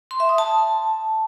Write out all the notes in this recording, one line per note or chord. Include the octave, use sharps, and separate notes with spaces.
C6
E5
D#6
A5